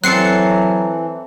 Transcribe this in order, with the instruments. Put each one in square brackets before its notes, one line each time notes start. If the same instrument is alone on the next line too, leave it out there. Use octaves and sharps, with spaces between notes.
[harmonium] E3 [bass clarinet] F#3 [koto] C4 A4 [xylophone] F#6 C7 C#7